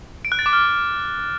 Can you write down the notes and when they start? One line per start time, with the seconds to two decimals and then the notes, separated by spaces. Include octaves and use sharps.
0.25 D7
0.32 F#6
0.39 A6
0.46 D6
0.53 F6